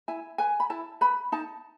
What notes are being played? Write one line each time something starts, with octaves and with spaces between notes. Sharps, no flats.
E4 G#5
B4 G#5
B5
E4 A5
B4 B5
D#4 A5